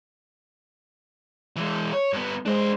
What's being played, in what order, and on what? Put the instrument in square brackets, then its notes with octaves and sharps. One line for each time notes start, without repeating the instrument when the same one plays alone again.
[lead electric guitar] E3 G#3
C#5
G2 B3
[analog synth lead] G#3 [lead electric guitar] D4 C5